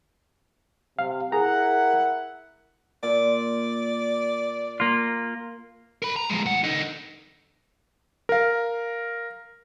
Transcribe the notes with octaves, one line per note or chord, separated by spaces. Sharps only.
C3 F5
E4 G#4 A#4 F#5 A#5
A#2 D5
A#3 F4
A#4 B5
A#5
F3 G#3
A2 F#5
D3 D#4
A#4 F5